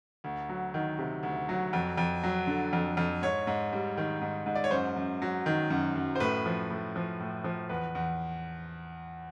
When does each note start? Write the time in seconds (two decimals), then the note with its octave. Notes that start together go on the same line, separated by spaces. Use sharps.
0.24 D2
0.49 F#3
0.74 D#3
0.99 C3
1.23 D2
1.49 F#3
1.73 F2
1.98 F2
2.23 F#3
2.47 D3
2.73 F2
2.97 F2
3.22 G#2 C#5
3.47 G#2
3.73 G3
3.97 D#3
4.21 G#2
4.46 G#2
4.55 D5
4.64 C#5
4.71 F#2 C5
4.96 F#2
5.22 F#3
5.46 D#3
5.70 F#2
5.95 F#2
6.15 C5
6.20 A2 B4
6.46 F3
6.70 A2
6.96 F3
7.20 A2
7.44 F3
7.69 E2 B4
7.95 E2